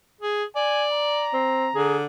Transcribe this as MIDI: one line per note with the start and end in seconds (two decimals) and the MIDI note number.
0.20 0.44 68
0.55 1.37 74
0.55 0.87 80
0.92 2.07 82
1.33 1.69 60
1.75 2.06 50
1.75 1.97 68